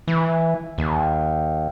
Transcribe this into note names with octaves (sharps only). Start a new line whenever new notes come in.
E3
D#2